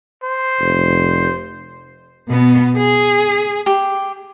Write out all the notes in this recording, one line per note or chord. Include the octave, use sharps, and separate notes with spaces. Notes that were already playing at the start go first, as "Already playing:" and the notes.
C5
F1
B2 B3
G#4
G4